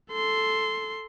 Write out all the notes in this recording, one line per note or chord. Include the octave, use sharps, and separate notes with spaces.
A4 C6